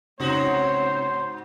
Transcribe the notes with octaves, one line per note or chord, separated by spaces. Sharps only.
G#2 C#3 C4 D#4 F#4 C5 C#5